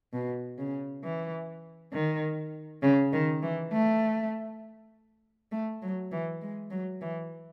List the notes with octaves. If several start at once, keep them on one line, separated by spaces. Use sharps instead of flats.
B2
C#3
E3
D#3
C#3
D#3
E3
A3
A3
F#3
E3
G#3
F#3
E3